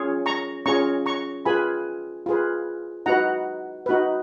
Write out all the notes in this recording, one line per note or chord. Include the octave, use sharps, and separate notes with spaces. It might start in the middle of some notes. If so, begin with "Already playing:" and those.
Already playing: C#4 F4 G#4 C#5
A#5 C#6
C#4 F4 G#4 C#5 A#5 C#6
A#5 C#6
F4 G#4 B4 G#5 B5
F4 G#4 B4
D#4 F#4 B4 F#5 A#5
D#4 F#4 B4